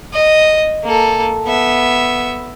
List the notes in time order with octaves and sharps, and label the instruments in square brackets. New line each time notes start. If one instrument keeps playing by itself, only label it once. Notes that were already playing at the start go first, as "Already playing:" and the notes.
[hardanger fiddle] D#5
A#3 A4
B3 E5